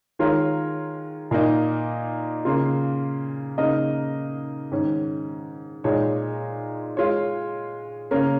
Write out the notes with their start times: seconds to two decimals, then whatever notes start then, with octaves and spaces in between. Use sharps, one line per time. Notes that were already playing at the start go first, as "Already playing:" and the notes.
0.19 D#3 G#3 F4 A#4 C#5
1.31 A#2 A#3 D#4
2.45 C#3 A#3 F4
3.57 C#3 A#3 D#4 A#4 D#5
4.72 G#2 D#3 C#4
5.84 A#2 G#3 D#4 C#5
6.97 G#3 F4 C#5
8.11 C#3 A#3 C#4 A#4